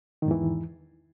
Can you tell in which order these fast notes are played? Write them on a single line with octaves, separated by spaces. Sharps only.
D#3 G#2 E2 E3